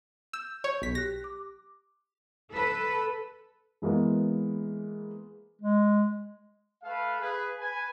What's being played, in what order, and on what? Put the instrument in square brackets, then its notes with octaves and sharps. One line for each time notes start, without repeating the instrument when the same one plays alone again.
[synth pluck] E6 [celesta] G6
[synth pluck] C#5
B1 B6
[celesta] G4 F#6 [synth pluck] A#6
[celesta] D6
[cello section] A4 B4
[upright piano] E3 G#3 A#3 B3
[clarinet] G#3
[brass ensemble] A3 A4 B4 F5
G#4 B4
B4 G#5